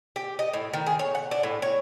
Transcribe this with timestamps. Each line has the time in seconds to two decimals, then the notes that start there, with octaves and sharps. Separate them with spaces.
0.16 G4
0.39 D#5
0.53 A2
0.73 D#3
0.86 G#4
0.99 C#5
1.15 F#5
1.31 D4
1.43 A2
1.62 C#5